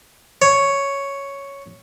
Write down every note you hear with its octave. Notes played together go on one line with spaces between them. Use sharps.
C#5